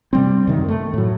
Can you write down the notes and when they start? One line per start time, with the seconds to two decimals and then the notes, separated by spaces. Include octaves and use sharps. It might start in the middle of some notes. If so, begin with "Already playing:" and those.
0.13 C3 G3 C4
0.47 F#2 C3 D#3
0.68 A3
0.94 A2 F#3